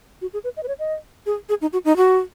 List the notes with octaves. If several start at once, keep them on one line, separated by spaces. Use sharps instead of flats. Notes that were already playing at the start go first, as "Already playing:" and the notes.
F#4
G#4
B4
D#5
B4
C#5
D#5
G#4
G#4
D#4
F#4
D#4
F#4